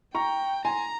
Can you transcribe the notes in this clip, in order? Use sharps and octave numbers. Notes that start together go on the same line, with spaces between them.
G5 A#5 C#6
G#5 A#5 C6